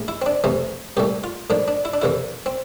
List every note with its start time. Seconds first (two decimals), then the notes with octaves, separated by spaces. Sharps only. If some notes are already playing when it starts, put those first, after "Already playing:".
Already playing: A#1 A2 A3
0.08 E4
0.22 C4
0.26 D4
0.44 F2 C3 E3 A3
0.97 C2 A#2 A3 G4
1.24 F4
1.50 A2 F3 A#3 D4
1.68 D4
1.85 E4
1.94 D4
2.02 F2 C3 E3 A#3 E4
2.46 C4